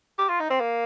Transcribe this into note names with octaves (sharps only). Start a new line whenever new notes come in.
G4
F4
D#4
C4
A#3